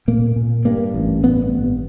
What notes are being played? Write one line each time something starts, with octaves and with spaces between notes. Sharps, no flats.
A#2 A#3
A#2
G2 A#3
A1
G2 B3
G#1